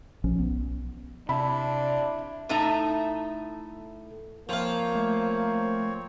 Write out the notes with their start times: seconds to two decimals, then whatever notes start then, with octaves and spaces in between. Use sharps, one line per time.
0.24 A#1 F3 C#4
0.39 B1 B3
1.29 C3 D4 E4 A5 B5
2.49 A2 A3 D#4 E5 A5 A#5
4.49 F3 A#3 C4 C#5 F5
4.95 A3